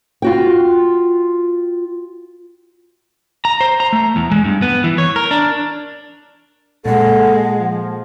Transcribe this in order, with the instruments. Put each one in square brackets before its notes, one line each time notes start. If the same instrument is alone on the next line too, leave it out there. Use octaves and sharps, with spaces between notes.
[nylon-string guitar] F4 F#4 G5
[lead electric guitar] A#5
C5
A#5
A3
E2
G#3
G2
B3
E3
C#5
A#4
D4
[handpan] A#2 [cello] G#3 [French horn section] A4 [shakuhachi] F#5
[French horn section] F3